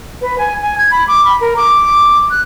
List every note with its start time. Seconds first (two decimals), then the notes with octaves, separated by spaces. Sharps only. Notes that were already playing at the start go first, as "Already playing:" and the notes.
0.22 B4
0.38 G#5
0.62 G#5
0.78 G#6
0.91 B5
1.08 D6
1.25 B5
1.41 A#4
1.57 D6
2.31 F#6